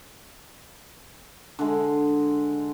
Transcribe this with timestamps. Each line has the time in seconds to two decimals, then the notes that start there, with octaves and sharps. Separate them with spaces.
1.59 D3 G#3